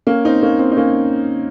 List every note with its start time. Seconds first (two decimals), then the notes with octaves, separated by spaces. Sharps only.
0.07 A#3 C#4
0.25 C4 D#4
0.43 A#3 C#4
0.59 C4 D#4
0.71 D#4
0.76 A#3 C#4